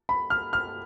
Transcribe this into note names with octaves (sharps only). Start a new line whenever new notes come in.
B5
F6
F6